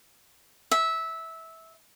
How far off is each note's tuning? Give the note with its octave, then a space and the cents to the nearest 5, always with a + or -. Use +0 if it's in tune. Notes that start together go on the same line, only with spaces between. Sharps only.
E5 -15